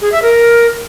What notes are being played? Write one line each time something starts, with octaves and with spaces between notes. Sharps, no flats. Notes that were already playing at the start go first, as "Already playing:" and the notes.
G#4
E5
A#4